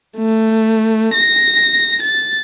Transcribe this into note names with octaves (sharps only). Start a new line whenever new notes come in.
A3
A#6
A6